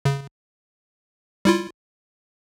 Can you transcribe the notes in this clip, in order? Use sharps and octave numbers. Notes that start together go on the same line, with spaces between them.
C#3
G3 E4 F4